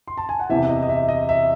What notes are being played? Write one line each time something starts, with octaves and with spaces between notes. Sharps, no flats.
C6
A5
G#5
F#5
E2 C3 E3 E5
D#5
D#5
E5
D#5
E5